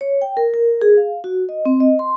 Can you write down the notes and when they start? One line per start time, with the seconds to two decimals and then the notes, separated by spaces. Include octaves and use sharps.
0.01 C#5
0.22 G5
0.37 A#4
0.54 A#4
0.82 G#4
0.97 F5
1.24 F#4
1.49 D#5
1.66 C4
1.80 D#5
1.99 C6